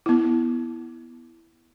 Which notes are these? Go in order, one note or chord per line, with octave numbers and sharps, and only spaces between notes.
B3 E4